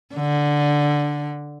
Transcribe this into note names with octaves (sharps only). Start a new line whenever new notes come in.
D3